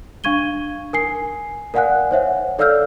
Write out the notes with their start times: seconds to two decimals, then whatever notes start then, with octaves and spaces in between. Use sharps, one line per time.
0.24 D4 F5 C#6 G#6 D#7 G7
0.93 A#4 G#5 C7
1.74 A#4 D5 F5 F#5 G#5 F#6
2.11 C5 C#5 E5 F#5
2.59 A4 D5 F5 E6 F6 G6